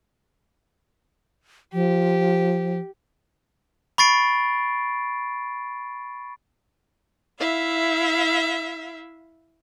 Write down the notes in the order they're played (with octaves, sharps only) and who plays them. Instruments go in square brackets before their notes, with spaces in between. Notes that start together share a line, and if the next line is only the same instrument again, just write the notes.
[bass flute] F3 [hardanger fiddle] G4
[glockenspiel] B5 C#6 A6 C7 D7
[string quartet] E4 E5 F5